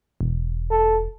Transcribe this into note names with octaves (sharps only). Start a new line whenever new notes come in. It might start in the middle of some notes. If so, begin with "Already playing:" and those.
E1
A4